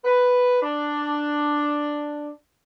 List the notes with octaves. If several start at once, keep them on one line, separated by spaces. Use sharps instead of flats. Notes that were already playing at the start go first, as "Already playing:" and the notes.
B4
D4